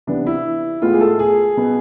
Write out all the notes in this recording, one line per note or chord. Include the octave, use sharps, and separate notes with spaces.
C3 E3 B3 D4
E4
A2 G#3 B3 F4
G#4
A4
G#4
B2 B3